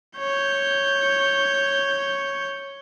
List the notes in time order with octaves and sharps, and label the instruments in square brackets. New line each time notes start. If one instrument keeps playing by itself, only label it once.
[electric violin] C#5 G6